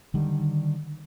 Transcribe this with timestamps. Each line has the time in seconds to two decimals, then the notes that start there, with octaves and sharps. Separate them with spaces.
0.14 D3 D#3 G3